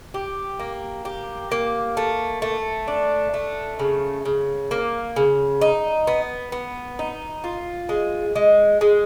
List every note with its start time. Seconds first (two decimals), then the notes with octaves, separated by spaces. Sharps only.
0.14 G4
0.59 A#3
1.05 G4
1.52 A#3
1.97 A3
2.42 A3
2.88 D4
3.34 A3
3.79 C#3
4.25 C#3
4.71 A#3
5.16 C#3
5.61 D#4
6.07 B3
6.52 B3
6.99 D#4
7.44 F4
7.89 G#3
8.36 G#3
8.81 G#3